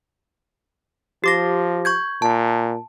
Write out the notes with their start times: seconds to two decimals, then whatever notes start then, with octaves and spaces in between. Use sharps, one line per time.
1.24 F3 G4 D6 A#6
1.85 C#6 G6 G#6
2.22 A#2 A5